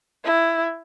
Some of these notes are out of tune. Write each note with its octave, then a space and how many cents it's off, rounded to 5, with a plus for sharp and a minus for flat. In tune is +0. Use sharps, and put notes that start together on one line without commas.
E4 +10